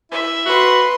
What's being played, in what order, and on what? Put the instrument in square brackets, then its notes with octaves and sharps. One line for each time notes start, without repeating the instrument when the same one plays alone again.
[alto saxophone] E4 [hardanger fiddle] E5
[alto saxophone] F#4 [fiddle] B4 C6